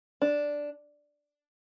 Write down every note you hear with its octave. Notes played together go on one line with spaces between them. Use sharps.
D4